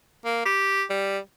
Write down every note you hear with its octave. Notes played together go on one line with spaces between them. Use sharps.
A#3
G4
G3